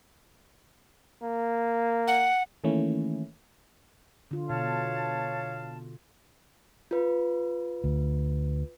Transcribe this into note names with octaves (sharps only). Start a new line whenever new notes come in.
A#3
F#5
D#3 E3 A3 A#3 C#4 E4
D3 F4
B2 C#5 F5 A5
F4 B4
D2